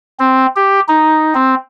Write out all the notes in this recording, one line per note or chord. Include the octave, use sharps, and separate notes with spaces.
C4
G4
D#4
C4